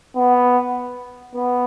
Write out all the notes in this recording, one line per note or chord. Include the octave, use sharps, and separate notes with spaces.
B3
B3